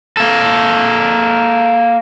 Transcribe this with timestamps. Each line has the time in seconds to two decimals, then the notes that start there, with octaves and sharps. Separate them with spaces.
0.17 A#3 A4